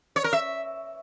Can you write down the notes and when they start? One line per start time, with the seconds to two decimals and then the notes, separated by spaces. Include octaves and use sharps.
0.16 C#5
0.24 A#4
0.33 E5